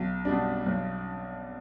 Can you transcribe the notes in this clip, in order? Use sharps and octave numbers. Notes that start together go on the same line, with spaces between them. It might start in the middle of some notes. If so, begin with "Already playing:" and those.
Already playing: B1
B2 G3 D4
B1